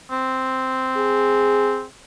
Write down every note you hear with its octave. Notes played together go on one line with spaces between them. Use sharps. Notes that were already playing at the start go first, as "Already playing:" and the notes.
C4
G#4